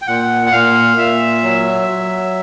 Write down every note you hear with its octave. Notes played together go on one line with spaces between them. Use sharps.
G5
A#2 F#5
F#5
A#2 F5
A#2 E5
F#3
F#3